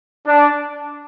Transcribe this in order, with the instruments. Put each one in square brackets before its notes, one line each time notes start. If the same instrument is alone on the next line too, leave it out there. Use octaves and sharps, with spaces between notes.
[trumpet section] D4